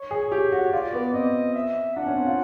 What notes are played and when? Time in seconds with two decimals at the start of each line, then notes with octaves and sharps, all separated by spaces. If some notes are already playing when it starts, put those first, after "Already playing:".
Already playing: C#5
0.11 G#4
0.32 G4
0.52 F#4
0.72 F4 D5
0.93 B3
1.14 C4 D#5
1.55 E5
1.96 D4 F#5
2.06 C#4
2.16 C4
2.26 F4